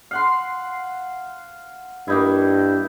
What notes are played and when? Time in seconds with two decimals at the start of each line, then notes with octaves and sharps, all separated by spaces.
0.11 F5 F#5 C6
2.08 G2 A#3 D#4 E4